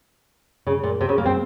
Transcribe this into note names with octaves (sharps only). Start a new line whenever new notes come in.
C#3
A#2
C3
C#3
A#3
C4